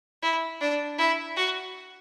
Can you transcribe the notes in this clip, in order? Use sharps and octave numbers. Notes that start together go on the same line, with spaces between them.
E4
D4
E4
F#4